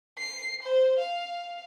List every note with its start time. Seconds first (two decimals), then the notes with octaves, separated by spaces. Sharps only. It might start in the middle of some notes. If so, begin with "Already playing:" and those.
0.19 C7
0.63 C5
0.99 F5